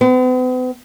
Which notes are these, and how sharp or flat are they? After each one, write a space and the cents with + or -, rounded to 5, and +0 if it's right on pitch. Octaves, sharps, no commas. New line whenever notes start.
B3 +45